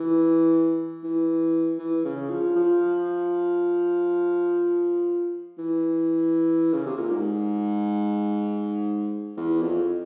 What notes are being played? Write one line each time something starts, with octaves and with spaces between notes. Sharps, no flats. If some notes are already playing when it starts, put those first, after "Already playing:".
Already playing: E3
E3
E3
C#3
F3
F3
E3
C#3
C3
A#2
G#2
E2
F2